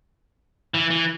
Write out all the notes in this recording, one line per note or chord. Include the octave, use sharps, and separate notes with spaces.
E3
E3